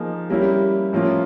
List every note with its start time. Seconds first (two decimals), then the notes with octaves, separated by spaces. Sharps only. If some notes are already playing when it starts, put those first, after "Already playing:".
Already playing: F3 A#3 D#4 G#4
0.30 G3 A#3 C#4 E4 G4
0.93 A2 F3 A#3 C#4 F4